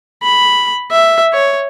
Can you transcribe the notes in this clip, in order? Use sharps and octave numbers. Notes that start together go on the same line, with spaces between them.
B5
E5
C#5